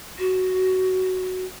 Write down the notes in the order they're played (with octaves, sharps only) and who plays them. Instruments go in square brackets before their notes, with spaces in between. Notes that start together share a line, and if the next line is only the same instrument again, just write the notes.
[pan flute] F#4